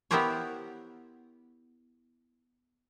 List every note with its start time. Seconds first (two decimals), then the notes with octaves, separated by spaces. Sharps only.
0.11 B3 E4 G4 A#4 C5 C#5